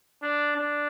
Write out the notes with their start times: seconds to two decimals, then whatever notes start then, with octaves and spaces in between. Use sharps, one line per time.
0.22 D4
0.56 D4